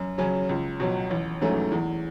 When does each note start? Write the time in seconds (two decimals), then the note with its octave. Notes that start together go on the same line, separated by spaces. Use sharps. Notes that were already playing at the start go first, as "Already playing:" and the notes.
Already playing: F#2
0.18 C#3 F#3 C#4
0.49 C#2
0.80 B2 F#3
1.11 A1
1.41 G#2 F#3 A3 C#4
1.72 E2